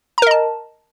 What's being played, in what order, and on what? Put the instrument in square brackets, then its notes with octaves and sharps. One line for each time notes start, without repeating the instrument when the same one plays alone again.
[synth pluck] A#5
A#4
D#5
A5